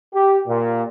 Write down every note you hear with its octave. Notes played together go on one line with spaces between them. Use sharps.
G4
A#2